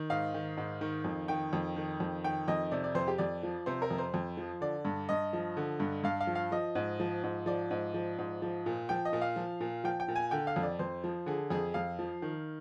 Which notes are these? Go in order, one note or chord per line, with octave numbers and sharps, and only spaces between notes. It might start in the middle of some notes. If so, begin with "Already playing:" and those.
Already playing: D#3
G#2 F5
D#3
G#2
D#3
F2
D#3 G5
F2
D#3
F2
D#3 G5
F2 D#5
C3 D5
D5
F2 C5
G4
F2 D5
F3
C3 C5
A#4
F2
C5
F2
F3
D3 D5
G2
G2 D#5
F3
D3
G2
G2 F5
F5
F3
F5
F3 D#5
G#2
F3
G#2
F3 D5
G#2
F3
G#2
F3
A#2
F3 G5
D#5
A#2
F5
F3
A#2
F3 G5
G5
A#2
G#5
D3 G5
F5
F2
D5
F2 C5
F3
D3 G#4
F2 G#4
F2 F5
F3
D#3